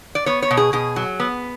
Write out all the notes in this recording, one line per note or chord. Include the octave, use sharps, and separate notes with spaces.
D5
B3 C#5
C#5
B2
G#4
B2 G#4
F#3
B3